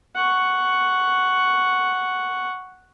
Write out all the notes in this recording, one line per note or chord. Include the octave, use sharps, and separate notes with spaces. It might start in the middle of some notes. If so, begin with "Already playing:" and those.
F#5 C#6